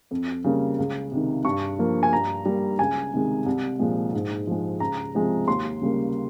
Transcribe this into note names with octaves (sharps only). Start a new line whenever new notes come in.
F2
C#3 G3 A#3
C#2
C3 D#3
G2 C#6
F3 A#3
G#5
G2 A#5
G3 A#3
C#2 G#5
C3 D#3 G#3
C2
A#2 F3 G#3
G#2
F3 G#3
C#2 A#5
C3 F3 G#3
D#2 C6
C#3 G3 A#3